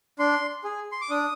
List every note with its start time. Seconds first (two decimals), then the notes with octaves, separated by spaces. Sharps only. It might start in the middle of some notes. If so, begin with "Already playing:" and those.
0.19 D4 C6
0.64 G#4
0.92 C6
1.01 D6
1.10 D4 D#6